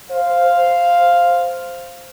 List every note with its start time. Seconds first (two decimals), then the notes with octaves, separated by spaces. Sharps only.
0.11 C5 F5